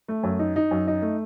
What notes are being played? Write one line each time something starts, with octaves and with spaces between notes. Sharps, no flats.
A3
F#2
D#4
D#4
F#2
D#4
A3